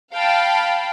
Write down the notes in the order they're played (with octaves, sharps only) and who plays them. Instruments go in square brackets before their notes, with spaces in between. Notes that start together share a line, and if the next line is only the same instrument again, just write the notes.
[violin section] F5 G5 A5 B5